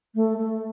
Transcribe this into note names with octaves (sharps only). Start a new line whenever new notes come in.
A3
A3